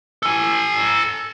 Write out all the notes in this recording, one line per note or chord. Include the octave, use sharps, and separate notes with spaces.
A4 G#5